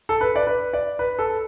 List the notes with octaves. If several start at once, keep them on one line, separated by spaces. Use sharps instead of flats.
A4
B4
D5
B4
D5
B4
A4